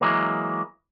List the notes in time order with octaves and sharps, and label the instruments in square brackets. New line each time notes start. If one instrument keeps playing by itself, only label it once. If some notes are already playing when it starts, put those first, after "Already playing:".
[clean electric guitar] E3 F#3 G#3 A#3